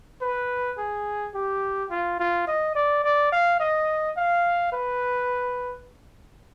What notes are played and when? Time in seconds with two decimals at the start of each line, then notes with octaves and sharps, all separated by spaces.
0.22 B4
0.78 G#4
1.34 G4
1.91 F4
2.20 F4
2.47 D#5
2.75 D5
3.04 D5
3.32 F5
3.60 D#5
4.17 F5
4.73 B4